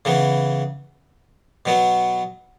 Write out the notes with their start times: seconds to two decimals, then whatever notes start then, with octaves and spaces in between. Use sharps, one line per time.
0.05 C#3 E3 B3
1.65 B2 F#3 B3